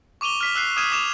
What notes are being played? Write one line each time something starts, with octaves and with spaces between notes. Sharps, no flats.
C#6 D6 D#7 F7 G7
F6 B6
E6 F#6 C7
D6 D#6 F6 G#6 D#7 E7
D6 B6 E7 F7